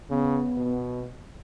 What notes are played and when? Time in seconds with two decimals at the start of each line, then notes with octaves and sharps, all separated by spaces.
0.10 C#3 B3
0.57 B2